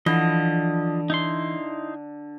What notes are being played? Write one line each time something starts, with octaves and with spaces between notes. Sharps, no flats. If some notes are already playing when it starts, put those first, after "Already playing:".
D3 E3 F3 D#5
D#4 E4 C6